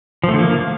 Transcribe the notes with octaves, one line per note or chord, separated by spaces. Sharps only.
F3
A3
D3
A#3